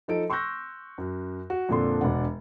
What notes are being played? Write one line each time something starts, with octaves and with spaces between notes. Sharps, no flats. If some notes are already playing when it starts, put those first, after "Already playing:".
F3 D#4 A4 D7
C6 C#6 E6 F#6 G6 A#6
F#2
F#4
F2 A#2 D3 D4 A4 C6
E1 D4 F#5